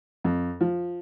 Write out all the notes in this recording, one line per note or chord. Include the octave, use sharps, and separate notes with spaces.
F2
F3